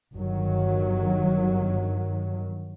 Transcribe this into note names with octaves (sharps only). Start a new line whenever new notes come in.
G1 D#3 F#3